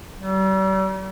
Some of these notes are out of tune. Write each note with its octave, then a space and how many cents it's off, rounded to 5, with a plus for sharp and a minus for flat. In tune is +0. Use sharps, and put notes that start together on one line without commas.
G3 -40